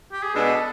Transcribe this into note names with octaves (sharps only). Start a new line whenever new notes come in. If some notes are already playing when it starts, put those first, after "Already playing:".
G4
G#4
B2 G#3 B3 D4 A4